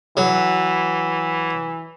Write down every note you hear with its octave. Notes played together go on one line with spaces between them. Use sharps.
E3 F#3